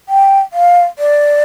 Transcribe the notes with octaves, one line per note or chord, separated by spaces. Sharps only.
G5
F5
D5